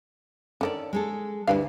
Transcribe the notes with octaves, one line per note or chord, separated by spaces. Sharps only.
D3 D#3 C#4 A4 D5
G#3 G#4 A4
D2 G2 E4 B4 F5